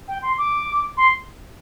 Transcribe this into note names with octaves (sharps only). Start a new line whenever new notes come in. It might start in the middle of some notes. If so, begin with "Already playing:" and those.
G5
C6
D6
C6